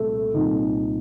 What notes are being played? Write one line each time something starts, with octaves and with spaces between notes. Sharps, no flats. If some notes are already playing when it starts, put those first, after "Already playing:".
Already playing: C2 A#2 A3
C2 A#2 D#4